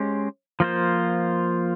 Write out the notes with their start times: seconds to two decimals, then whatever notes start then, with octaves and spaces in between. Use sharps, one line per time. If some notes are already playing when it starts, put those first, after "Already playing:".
Already playing: G#3 C#4 G4 C5
0.60 F3 A#3 F4 C5